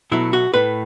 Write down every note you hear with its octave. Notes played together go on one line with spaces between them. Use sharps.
B2 F#3 A3 E4
F#4
A2 A3 B4